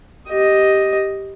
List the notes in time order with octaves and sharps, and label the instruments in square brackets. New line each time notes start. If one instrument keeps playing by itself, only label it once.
[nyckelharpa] G4 D#5